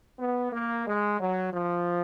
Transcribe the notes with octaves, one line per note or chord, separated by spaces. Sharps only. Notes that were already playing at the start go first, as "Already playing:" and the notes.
B3
A#3
G#3
F#3
F3